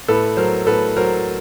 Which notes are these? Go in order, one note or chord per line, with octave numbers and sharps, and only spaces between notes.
A2 A4 B4
F#3 A#4 C5
A2 A4 B4
F#3 A#4 C5